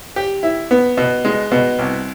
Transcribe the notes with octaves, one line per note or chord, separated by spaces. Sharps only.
G4
E4
B3
B2
G#3
B2
C2